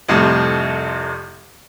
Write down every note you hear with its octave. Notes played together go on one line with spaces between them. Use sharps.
C2 F2 A2 C3